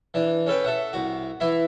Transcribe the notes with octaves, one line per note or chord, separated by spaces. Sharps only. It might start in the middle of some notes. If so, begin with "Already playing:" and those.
E3 D4
C#4 A4 B4 G5
A4 E5 F#5
C2 F#4
E3 E4 B5